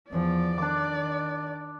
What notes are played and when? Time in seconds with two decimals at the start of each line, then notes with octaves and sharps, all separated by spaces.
0.10 E2 F3 D5
0.58 D#3 D4 D6